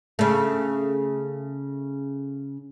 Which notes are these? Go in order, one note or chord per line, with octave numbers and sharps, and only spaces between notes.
C#3 A3